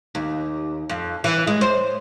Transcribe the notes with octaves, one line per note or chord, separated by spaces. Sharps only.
D#2
F2
E3
G#3
C5